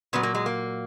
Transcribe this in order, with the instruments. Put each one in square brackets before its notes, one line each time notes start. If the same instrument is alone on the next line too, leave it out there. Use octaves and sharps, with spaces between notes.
[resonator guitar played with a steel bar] A#2 F#3 B3
A#3
G#3
A#3